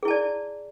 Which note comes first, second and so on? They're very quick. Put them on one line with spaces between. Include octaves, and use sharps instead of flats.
G#4 E4 A5 D5